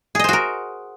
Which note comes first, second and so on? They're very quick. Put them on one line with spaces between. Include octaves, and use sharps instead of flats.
G#4 D#5 C5 F#4 A#4